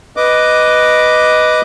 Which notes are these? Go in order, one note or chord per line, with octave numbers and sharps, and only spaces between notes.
B4 D#5 D6